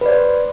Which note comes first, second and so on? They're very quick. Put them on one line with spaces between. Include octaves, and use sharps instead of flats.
B4 D5 C5